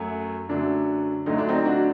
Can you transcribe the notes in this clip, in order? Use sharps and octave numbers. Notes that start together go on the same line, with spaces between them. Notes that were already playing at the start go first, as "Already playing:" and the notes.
Already playing: F#2 F#3 A3
F#2 D3 F#3 A3 D4
D2 D3 F#3 A3 D#4
D4
C4 D#4
D4 F#4